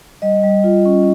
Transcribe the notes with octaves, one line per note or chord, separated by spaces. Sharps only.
G3 D#5
G3
F4
C#4